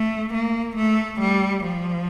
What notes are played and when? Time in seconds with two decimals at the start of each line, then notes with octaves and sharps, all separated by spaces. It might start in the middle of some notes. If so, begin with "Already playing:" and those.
Already playing: A3
0.34 A#3
0.77 A3
1.20 G3
1.64 F3